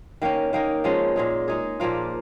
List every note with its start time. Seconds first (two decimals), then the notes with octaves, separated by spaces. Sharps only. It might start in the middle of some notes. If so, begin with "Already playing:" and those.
0.22 D#3 A#3 C#4
0.53 D#3 A#3 D#4
0.84 F3 G#3 C#4
1.16 A#2 G#3 D#4
1.48 G#3 D#4 G#4
1.80 A#2 F3 A#3 F4